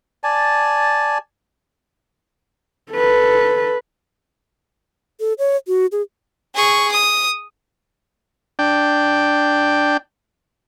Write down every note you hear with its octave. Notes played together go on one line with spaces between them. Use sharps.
D5 G#5 A5
A4 B4
A4
C#5
F#4
G#4
G#4 C#6
D#6
D4 G5